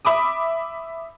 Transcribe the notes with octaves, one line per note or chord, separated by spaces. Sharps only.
E5 B5 D6 D#6